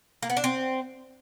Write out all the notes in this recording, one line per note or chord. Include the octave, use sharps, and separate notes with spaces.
A#3
B3
D4
C4